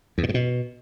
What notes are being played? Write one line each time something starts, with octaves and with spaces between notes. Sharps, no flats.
E2
A#2
G#2
B2